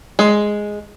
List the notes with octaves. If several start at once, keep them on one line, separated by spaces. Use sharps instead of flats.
G#3